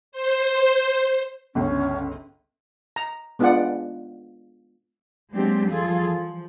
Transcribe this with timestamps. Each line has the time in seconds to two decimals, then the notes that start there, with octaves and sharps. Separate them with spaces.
0.12 C5
1.55 G1 C#2 C#4
2.96 A#5
3.39 G#3 B3 D4 F4 D5 F#5
5.33 F#3 G#3 A#3 C4 D4 G4
5.70 E3 F3 G3 F4 G#4 A4
6.09 F3